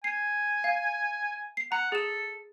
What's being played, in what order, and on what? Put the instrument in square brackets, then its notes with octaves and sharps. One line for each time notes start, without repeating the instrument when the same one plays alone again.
[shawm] G#5 [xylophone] C7
[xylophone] F5
C7
[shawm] F#5 [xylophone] A#5
[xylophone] G#4 E7 [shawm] A4